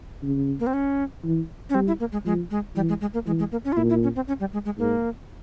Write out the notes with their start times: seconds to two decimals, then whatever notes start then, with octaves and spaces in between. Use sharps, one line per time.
0.23 C#3
0.60 A#3
0.67 C4
0.73 C#4
1.24 E3
1.70 C#4
1.74 G3 C4
1.87 E4
2.00 A#3
2.12 G#3
2.25 F3 G#3
2.51 G#3
2.76 E3 G3
2.89 G#3
3.01 G#3
3.14 A#3
3.26 E3 G#3
3.39 G#3
3.52 A#3
3.65 C#4
3.72 F4
3.77 A#2 E4
3.89 E4
4.03 C#4
4.16 C4
4.28 C#4
4.40 G3
4.53 G#3
4.65 G#3
4.78 G#2 A#3